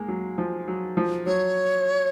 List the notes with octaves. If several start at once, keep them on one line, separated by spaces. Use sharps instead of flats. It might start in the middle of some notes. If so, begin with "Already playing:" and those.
Already playing: G#3 A#3
F#3
F3
F#3
F3
F#3 C#5